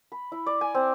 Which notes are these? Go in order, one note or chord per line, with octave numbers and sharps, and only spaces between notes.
B5
E4
D5
G#5
C4